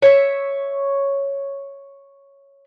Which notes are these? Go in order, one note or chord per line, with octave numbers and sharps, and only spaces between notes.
C#5 E5